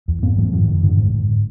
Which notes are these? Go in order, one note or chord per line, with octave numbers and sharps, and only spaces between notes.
E2
G#2 A#3 C4
G#2 E3 F#3
F#2 D#3 F3
F#2 D#3
G#2 D3
G#2
G#2